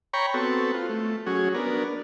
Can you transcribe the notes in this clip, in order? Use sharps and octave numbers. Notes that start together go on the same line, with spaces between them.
C#5 G5 A#5 B5 C#6
B3 C4 F#4 A4
F4
A3
F#3 C#4 F#4 G#4
B3 D4 A#4